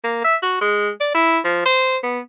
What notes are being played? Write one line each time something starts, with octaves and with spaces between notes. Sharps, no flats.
A#3
E5
F#4
G#3
D5
E4
F3
C5
B3